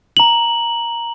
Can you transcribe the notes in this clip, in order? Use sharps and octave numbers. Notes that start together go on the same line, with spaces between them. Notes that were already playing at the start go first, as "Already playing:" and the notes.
A#5 F#7